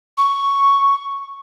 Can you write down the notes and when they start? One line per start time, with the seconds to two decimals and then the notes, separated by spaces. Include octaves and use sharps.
0.18 C#6